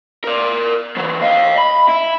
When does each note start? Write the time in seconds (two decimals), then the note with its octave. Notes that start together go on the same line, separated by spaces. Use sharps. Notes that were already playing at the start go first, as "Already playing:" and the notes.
0.24 A#4 D5
0.96 E3 F#3
1.22 D#5 F5
1.58 B5
1.89 E4